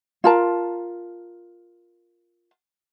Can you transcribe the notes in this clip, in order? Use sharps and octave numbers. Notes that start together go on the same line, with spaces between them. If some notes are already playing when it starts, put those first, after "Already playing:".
F4 A#4 A5